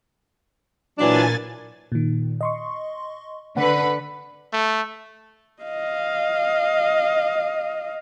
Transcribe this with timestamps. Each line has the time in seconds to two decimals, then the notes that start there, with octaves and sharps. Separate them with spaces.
0.98 A#2 E3 F#3 D4 G#5 A6
1.92 A#2 D#3
2.41 D#5 C6 C#6
3.57 D3 B4 F#5
4.53 A3
5.62 D#5 F5